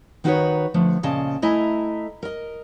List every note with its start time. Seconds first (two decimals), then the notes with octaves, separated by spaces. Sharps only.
0.24 D#3 D#4 F#4 A4 B4 C#5
0.74 D3 F3 A3
1.03 A#2 C#3 D#5 A5
1.42 A3 E4 D#5 E5 G#5 A#5
2.23 A#4 D#5